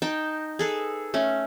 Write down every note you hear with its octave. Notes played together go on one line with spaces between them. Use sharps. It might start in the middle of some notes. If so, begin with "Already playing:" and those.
D#4 G5 A5
G#4 A4 B4
A3 C#4